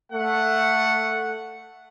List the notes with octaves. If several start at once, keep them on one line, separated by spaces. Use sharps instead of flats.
A3 F#5